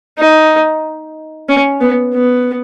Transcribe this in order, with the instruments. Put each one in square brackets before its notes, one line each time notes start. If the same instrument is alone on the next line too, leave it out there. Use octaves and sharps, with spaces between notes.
[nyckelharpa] D#4
C#4
B3
B3